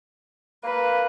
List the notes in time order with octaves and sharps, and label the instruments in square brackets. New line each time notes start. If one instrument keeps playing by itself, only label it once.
[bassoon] A#3 [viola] B4